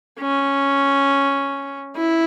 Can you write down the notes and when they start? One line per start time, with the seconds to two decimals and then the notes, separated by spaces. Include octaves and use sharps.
0.20 C#4
1.97 E4